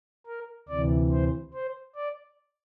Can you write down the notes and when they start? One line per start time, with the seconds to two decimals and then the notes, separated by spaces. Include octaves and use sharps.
0.26 A#4
0.68 D2 C3 E3 D5
1.12 C5
1.54 C5
1.96 D5